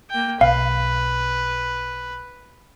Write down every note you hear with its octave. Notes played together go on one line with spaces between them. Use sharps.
A#3 G5
B1 B4 F5